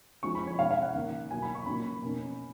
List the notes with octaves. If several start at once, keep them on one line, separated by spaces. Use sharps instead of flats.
F3 G#3 C#4 C#6
B5
C#5
B2 G#3 C#4 F5
F5
F#5
D#3 A#3 C#4
B2 F#3 A#3 G#5
B5
C#6
A#2 F#3 A#3 C#4 B5
B2 A#3 C#4